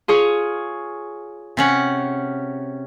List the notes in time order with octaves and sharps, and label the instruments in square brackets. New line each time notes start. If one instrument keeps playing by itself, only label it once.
[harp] F4 G#4 C#5
[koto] C3 C#4 F#5